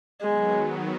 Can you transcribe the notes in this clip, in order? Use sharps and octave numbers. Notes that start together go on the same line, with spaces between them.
D#3 F#3 G#3 B3